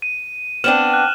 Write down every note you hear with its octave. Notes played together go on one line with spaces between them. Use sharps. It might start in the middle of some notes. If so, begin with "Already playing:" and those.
D#7
B3 C4 D4 F6 E7 F#7
F#6